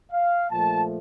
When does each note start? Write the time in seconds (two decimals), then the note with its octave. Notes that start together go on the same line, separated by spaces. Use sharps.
0.12 F5
0.49 A#2 F3 A3 A5